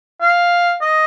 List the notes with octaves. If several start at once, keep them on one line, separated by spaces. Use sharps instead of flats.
F5
D#5